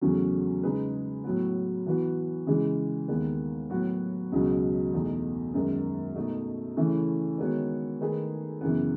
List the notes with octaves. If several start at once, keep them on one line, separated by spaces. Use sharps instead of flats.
E2 C#3 F#3 A3 C#4
C#3 G#3 D#4 G#4 B4
A2 F#3 B3
E3 B3 F#4 B4
C#3 E3 G#3
D#2 D#3 G#3 B3
A2 F#3 B3 F#4
C#2 B2 F#3 C#4
E2 B2 A3 D#4
F#2 D#3 G#3 B3
B2 A3 D#4
C#3 E3 A3 C#4 E4
D#3 G#3 B3 F#4 C#5
D#3 A3 D#4 G#4 B4
F#2 C#3 E3 B3